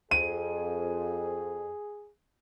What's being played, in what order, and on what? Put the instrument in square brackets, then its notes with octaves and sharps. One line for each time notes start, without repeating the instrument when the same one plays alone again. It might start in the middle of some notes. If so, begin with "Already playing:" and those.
[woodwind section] F2 [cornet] G#4 [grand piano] D#7